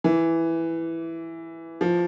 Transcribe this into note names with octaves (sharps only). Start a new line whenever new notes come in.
E3
F3